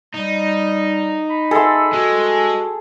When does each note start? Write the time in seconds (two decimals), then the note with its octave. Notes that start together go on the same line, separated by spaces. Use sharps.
0.15 G3 D#4
1.30 B5
1.51 G#4 A4 E5 C6
1.93 G#3 F#4